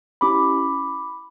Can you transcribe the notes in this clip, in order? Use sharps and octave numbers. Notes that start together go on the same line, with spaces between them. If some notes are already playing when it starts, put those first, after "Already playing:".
C#4 E4 G4 B5 D6